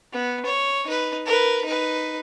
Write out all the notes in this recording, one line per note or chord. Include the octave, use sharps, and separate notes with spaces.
B3
C#5
D#4 B4
A#4 B4
D#4 B4